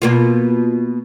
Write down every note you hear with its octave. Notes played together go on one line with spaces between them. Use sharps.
B2 A#3 F4